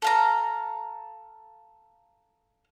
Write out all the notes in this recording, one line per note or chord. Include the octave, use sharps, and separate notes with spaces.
A4 F5 A#5